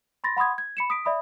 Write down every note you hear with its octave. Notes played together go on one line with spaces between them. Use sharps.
B5 C6 A6 A#6
F#5 B5 C6 D#6 G#6
G#6
B5 C#7 E7
D#6 B6 D7
D5 E5 B5 D#6